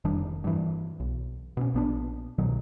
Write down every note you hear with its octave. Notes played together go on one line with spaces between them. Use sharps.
F1 D#3 G3 D4
G2 E3
B1
B2 C4 C#4
A#1 B3 D4
C2 B2 D#3 F#3